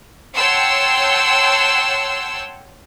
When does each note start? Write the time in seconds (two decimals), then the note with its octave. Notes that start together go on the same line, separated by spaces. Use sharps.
0.35 C#5 F#5 G5 A5 C6 E6